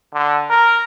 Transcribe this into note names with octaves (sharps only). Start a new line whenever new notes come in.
D3
A#4